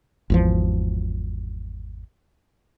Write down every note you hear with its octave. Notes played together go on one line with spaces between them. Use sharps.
G#1 E2 F3